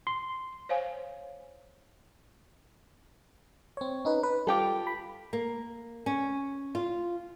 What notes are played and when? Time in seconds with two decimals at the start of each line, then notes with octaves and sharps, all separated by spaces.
0.07 C6
0.69 C5 C#5 F5 G#5
3.77 C4 C#5
4.05 C#4 D#4 B4
4.23 B4
4.47 G3 F4 G4 A4 D6
4.87 B5
5.33 A#3
6.06 C#4
6.75 F4